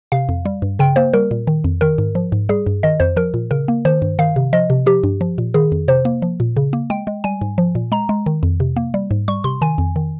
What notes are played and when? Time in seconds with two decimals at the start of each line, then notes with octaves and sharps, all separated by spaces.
0.12 C3 F5
0.29 F2
0.45 G3
0.62 G2
0.79 C#3 G5
0.96 A#3 C5
1.13 G3 A#4
1.31 A#2
1.47 D#3
1.64 F2
1.81 D#3 A#4
1.98 G#2
2.15 F3
2.32 G#2
2.49 G3 G#4
2.66 G2
2.83 D#3 D#5
3.00 F2 C5
3.17 F3 A#4
3.34 A#2
3.51 C#3 A#4
3.68 A#3
3.85 D#3 C5
4.02 G2
4.19 D#3 F5
4.36 C3
4.53 F3 D#5
4.70 C3
4.86 F3 G4
5.04 G2
5.21 F3
5.38 A#2
5.54 D#3 G#4
5.72 F2
5.88 C3 C5
6.05 A#3
6.22 F3
6.40 A#2
6.57 C#3
6.73 A#3
6.90 G#3 G5
7.07 G#3
7.24 G3 G#5
7.41 G#2
7.58 F3
7.75 A#2
7.92 G#3 A#5
8.09 G#3
8.26 D#3
8.43 F2
8.60 C3
8.76 A#3
8.94 G3
9.11 G#2
9.28 G3 C#6
9.44 C3 C6
9.61 D#3 G#5
9.78 F2
9.96 D#3